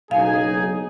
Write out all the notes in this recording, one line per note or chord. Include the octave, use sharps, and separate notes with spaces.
F#1 B1 D#4 G#4 F5 G#5